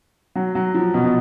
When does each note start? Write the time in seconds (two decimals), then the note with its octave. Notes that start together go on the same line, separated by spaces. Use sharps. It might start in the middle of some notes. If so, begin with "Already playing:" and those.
0.36 F#3
0.55 F#3
0.74 F3
0.94 B2
1.04 B2